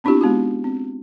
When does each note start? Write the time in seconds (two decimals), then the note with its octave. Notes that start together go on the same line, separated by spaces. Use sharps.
0.04 B3 C4 D4 E4 F4 G4
0.21 G#3 B3 D#4 F#4
0.64 C4